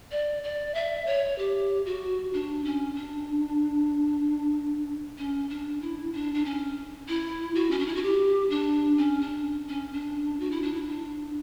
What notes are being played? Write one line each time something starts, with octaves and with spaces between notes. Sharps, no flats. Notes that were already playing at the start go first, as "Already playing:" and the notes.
D5
D5
E5
C#5
G4
F#4
D4
C#4
D4
C#4
D4
E4
D4
D4
C#4
E4
F#4
C#4
D4
E4
F#4
G4
D4
C#4
D4
C#4
D4
F#4
E4
D4
E4
D4